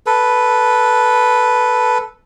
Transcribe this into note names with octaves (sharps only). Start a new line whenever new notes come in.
A4 B4